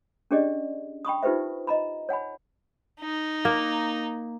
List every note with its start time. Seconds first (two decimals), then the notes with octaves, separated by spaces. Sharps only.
0.31 C#4 D4 G4 G#4 D5 D#5
1.05 G5 B5 C#6 D#6
1.23 D#4 F4 G4 B4 C5 E5
1.67 D#5 A#5 B5
2.09 C#5 F#5 G#5 B5
3.00 D#4
3.45 A#3